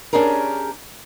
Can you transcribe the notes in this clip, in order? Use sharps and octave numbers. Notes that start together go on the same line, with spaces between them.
C#4 D4 G4 G#4 A#4